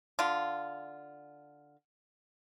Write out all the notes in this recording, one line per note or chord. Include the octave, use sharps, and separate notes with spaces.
D3 F4